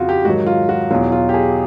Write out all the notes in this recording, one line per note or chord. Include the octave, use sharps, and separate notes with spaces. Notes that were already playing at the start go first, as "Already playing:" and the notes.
Already playing: F2 C#3 F3 F4 F#4
G4
G#2 D#3 F#3 F#4
F4
F#4
E2 B2 F#3 F4
F4
G4
G#4